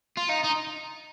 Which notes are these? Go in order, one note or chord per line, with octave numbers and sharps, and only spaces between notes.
F4
D#4
D#4